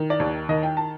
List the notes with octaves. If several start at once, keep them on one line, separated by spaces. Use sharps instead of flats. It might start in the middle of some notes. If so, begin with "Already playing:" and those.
Already playing: D#3
D5
D#2
D#3 D#5
G5
A5